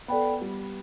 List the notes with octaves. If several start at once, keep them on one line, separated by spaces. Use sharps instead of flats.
B3 A4 D5 G5 B5
G3